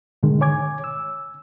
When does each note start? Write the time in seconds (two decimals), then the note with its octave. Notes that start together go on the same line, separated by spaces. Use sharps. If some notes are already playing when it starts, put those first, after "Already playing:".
0.23 G#2 B2 D3 D#3 G#3
0.41 C#5 G#5 D6 G#6
0.84 E6